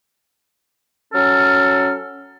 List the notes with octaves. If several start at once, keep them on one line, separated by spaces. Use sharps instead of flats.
F#3 C#4 A4 F6